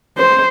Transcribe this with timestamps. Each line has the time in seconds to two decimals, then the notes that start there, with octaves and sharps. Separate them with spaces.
0.18 C5